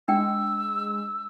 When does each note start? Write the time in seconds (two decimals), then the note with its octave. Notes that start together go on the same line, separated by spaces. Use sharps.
0.08 G#3 D4 G5 E6